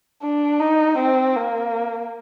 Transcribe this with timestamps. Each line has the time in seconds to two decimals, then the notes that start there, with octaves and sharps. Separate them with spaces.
0.23 D4
0.60 D#4
0.98 C4
1.36 A#3